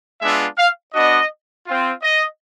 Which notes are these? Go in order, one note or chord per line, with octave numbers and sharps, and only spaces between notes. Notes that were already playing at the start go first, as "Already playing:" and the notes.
G#3 B3 D4 F4 E5
F5
B3 D4 F#4 D#5
C4 F4
D#5